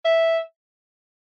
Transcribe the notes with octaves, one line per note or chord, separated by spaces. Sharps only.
E5